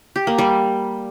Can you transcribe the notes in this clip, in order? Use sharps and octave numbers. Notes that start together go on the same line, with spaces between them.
G4
A#3
G3